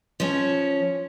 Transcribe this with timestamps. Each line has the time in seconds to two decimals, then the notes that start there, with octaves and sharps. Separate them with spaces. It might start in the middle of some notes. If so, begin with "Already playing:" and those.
0.20 F3 C#4